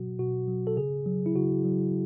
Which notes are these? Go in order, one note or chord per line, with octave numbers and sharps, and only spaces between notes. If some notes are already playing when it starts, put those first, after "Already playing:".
Already playing: B2 F#3 F#4
B2 F#4
F#3
A4
C#3 G#4
F#3
E4
C#3 F#4
F#3